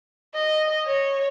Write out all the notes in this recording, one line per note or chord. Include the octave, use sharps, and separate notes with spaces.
D#5
C#5